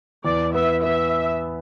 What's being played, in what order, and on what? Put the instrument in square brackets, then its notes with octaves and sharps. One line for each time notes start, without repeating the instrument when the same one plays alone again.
[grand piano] E2 [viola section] D5
[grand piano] B3 [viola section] E5
[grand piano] B3 [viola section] E5